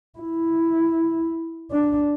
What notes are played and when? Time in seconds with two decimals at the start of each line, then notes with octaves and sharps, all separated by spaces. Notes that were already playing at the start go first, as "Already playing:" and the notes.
0.19 E4
1.71 D4